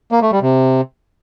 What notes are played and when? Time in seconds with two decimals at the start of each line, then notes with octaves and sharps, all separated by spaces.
0.12 A#3
0.22 A3
0.32 G3
0.42 C3